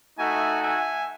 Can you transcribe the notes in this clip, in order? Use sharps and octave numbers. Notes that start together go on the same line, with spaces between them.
A3 D#4 F#4 E5 G#5
E5 G#5